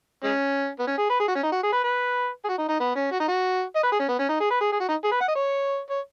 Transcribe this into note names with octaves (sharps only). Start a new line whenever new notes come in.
G#3 C#4
B3
C#4
G#4
B4
G#4
F#4
C#4
D#4
F#4
G#4
B4
B4
G#4
F#4
D#4
D#4
B3
C#4
F#4
D#4
F#4
D#5
B4
G#4
C#4
B3
C#4
D#4
G#4
B4
G#4
G#4
F#4
D#4
G#4
B4
F#5
D#5
C#5
C#5